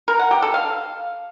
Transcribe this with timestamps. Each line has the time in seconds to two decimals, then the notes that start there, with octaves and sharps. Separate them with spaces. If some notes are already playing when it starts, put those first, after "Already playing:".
0.08 A#4
0.19 F#5
0.31 G4
0.42 A4
0.54 F5